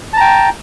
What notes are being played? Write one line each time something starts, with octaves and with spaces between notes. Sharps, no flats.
G5 A5 A#5